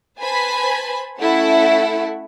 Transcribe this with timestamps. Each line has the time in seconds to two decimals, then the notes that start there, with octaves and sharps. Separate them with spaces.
0.22 B4 C5 G#5 A5 B5
1.20 A3 C#4 E4 A4 E5 F#5